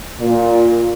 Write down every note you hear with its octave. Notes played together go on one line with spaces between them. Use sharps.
A#2